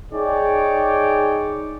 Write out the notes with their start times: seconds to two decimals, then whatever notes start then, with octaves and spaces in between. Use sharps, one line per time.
0.13 D#4 G#4 C#5 D5 G5